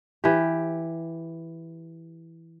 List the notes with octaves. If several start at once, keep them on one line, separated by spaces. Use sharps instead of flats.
E3 G4